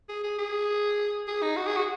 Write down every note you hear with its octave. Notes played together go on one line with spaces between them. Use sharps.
G#4
G#4
G#4
G#4
D#4
F#4
G#4
F#4